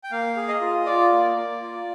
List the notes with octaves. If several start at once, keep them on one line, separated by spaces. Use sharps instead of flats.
G5
A#3 F5
G#4
D#5
F4
F4 D5
A#3
A#3
F4